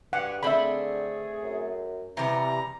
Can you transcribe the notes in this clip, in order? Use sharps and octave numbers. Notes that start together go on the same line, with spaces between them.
G2 G4 G#4 F#5
D3 A3 C4 G#4 E5 B5
F#2
C3 E3 G3 B3 A#5